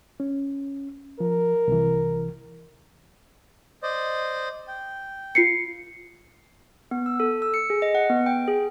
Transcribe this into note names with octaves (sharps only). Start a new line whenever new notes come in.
C#4
F3 A#4
C2 E3
C5 D5 D#5
G5
F4 C7 C#7
B3
E6
A4
E6
C#7
G#4
D#5
F#5
B3
G5
G#4